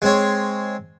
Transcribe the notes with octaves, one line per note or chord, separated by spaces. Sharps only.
G#3 C4 C#5